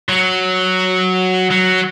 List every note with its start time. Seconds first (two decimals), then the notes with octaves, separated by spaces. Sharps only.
0.09 F#3
1.51 F#3